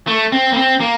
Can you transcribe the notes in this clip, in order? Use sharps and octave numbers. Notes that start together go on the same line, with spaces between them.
A3
C4
A#3
C4
A#3